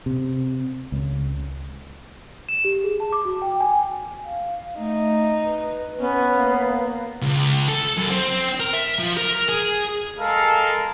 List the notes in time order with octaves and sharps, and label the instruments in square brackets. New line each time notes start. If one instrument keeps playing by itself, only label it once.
[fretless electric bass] C3
C#2
[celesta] E7
G4
G#4
A5
D6
F#4
G5
G#5
[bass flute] F5
[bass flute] A3 [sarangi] D#4
[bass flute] B4
[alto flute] B3 [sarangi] C#4
[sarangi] A#3 [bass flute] F5
[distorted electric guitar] C#2
A4
F#2
C4
A#4
E5
F3
A#4
G#4
[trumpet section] G#3 A4 A#4 F5